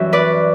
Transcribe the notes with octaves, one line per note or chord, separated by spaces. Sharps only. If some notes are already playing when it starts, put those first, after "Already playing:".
Already playing: F#2 E3 G3 E5
B4 D5